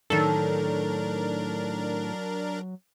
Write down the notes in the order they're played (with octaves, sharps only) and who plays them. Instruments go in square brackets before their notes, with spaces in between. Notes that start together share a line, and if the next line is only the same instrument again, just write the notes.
[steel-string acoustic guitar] A2 D#3 [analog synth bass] F#3 [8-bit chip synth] D4 A#4 [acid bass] A4